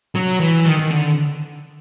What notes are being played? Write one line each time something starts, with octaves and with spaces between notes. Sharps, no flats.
F#3
E3
D#3
D#3
D3